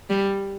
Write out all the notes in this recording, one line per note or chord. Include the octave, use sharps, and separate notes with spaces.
G3